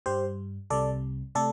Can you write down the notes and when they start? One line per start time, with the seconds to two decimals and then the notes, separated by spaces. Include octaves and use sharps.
0.06 G2 G3 G4 C5
0.70 C2 C3 G3 A4 D5
1.35 C3 A3 A4 D5